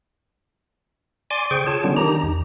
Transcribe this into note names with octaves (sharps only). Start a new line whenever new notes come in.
D5 G#5 C6 D6
C#3 G#4 C5 G5 C#6
F4 G#4 C#5 A5
D3 F#3 G3 B3 C#4 D4
D#3 D4 D#4 G4 A#5
E2